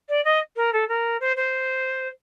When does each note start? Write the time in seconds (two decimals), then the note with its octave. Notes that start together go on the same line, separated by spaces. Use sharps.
0.09 D5
0.24 D#5
0.56 A#4
0.72 A4
0.88 A#4
1.20 C5
1.36 C5